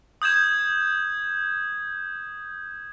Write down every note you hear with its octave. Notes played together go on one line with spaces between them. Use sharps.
D#6 G6 G#6 E7